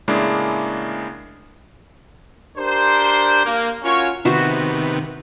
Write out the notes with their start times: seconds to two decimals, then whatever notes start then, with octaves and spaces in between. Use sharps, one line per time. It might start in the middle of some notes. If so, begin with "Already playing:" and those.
0.08 A2 C#3 G#3 A#3 D4 E4
2.57 D4 G4 A#4 C5
3.44 A#3
3.84 C#4 F4 F#4 A#4 C#5
4.25 C3 D#3 B3 F#4 C5 E5